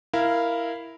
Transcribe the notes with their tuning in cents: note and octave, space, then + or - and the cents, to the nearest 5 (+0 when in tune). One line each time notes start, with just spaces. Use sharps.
E4 +0 A#4 +0 F5 -15